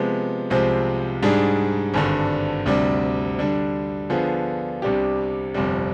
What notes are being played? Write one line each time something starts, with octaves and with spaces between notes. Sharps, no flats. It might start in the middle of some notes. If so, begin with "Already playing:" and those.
Already playing: C3 F3 G#3 B3
C2 C3 F3 G#3 C4
G#2 G3 D4 G#4
G#1 G2 D3
D2 C3 G3 D4
D3 G3 D4
D3 F3 B3 F4 G#4
C2 C3 G3 D4 G4
G1 F2 C3 G3